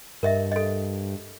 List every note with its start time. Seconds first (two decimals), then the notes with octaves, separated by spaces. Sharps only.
0.23 G2 A#4 D#5 E5
0.52 A4 D#5